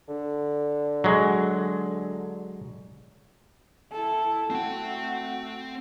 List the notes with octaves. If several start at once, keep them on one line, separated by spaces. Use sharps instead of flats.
D3
F#3 G#3
E4 A4
A3 C4 F#4 G5